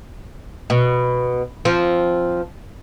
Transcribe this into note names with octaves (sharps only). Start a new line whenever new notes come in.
B2
F3 C4